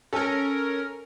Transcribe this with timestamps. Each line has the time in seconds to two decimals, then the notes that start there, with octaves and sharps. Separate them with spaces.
0.13 C#4 A4 A#4